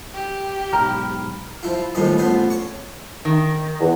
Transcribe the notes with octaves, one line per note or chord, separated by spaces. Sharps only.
G4
B1 G#2 A#5 B5 F6
F3 E4 F4
D#2 A2 F3 G3 D#5
A1 F3 B3 C5
C#5 C#6
D#3
E2